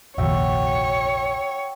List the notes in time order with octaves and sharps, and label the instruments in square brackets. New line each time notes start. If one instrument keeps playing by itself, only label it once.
[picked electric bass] F1 A#1 D#2 [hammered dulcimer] F#4 E5 G5 [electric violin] C#5